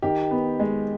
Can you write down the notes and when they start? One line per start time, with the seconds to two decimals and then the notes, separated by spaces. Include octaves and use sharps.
0.02 D#3 G4
0.31 B3
0.59 G#3